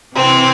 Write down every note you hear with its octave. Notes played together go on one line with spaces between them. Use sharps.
C3 E3 C4